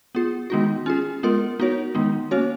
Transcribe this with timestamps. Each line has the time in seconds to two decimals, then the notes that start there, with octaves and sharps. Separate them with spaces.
0.15 B3 F4 G#4
0.50 D#3 G#3 B3 D#4 F#4
0.86 C#4 F4 G#4
1.23 G#3 B3 F4 A#4
1.60 B3 D#4 F#4 A#4 C#5
1.95 D#3 G#3 B3 D#4
2.31 A#3 C#4 F#4 C#5